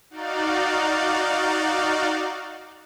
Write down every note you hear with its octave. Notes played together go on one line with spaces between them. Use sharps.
D#4 F#4 D5 F5